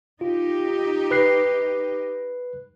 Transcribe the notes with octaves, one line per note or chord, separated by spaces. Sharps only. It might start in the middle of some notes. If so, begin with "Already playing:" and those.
D#4 F4 G4
B4 F#6 C7